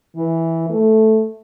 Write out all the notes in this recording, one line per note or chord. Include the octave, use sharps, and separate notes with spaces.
E3
A3